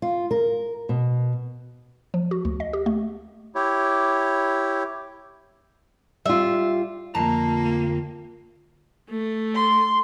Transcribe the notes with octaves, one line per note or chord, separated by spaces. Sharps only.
F4
A#4
B2
F3
F#4
D2
D#5
G4
A3
E4 G4 C#5
G3 F4 E5
F2 D3 A#3 F4 A5 A#5
A3
C6